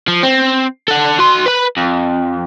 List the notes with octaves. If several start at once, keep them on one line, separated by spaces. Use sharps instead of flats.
F3
C4
A4 F#5
F#4 C6
B4 B5
F2